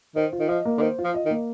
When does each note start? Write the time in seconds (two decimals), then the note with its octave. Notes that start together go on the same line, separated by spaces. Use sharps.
0.16 D#3 C5
0.33 F4
0.39 D#3
0.49 F3 D#5
0.65 A#3
0.77 D3
0.81 D#3 C5
0.98 F4
1.04 F3
1.14 D#5
1.25 D#3
1.30 A#3